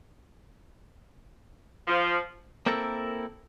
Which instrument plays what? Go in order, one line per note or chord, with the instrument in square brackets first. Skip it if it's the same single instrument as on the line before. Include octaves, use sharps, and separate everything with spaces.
[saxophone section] F3
[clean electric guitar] A#3 C4 E4 A4 A#4